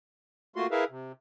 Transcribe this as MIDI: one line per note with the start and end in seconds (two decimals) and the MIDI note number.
0.56 0.67 57
0.56 0.67 58
0.56 0.67 65
0.56 0.67 66
0.56 0.67 84
0.71 0.85 64
0.71 0.85 68
0.71 0.85 70
0.71 0.85 71
0.71 0.85 76
0.71 0.85 77
0.90 1.12 48